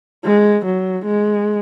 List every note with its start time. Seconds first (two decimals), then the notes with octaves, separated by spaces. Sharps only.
0.25 G#3
0.65 F#3
1.06 G#3